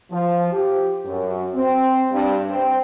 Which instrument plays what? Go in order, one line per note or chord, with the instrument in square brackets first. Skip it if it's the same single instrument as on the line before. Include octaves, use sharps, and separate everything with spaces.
[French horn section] F3
G4
F#2
C4
G2
C4